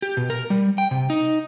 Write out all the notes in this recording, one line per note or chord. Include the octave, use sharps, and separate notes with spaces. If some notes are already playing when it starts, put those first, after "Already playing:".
G4
B2
A#4
G3
G5
C3
D#4